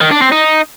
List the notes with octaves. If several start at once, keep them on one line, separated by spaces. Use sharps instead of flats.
D#3
D4
C4
D#4